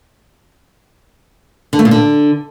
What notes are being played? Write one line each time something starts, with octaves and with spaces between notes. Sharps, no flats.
D3
A3
A#2
D3